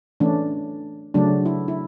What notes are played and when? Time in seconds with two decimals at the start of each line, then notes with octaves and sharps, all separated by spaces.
0.20 E3 A3 C#4 D4
1.14 C#3 F#3 A3 D4
1.46 E4
1.68 E4